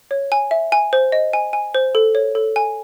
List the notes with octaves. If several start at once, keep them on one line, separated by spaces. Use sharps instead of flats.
C#5
G#5
E5
G#5
C5
D#5
G#5
G#5
C5
A4
C#5
A4
G#5